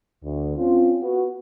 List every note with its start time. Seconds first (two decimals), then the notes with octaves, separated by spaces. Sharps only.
0.23 D2
0.57 C4 C#4 F4
1.01 B3 F#4